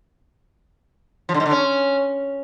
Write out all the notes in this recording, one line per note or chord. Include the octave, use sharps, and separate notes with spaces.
F3
D3
G#2
D3
C#4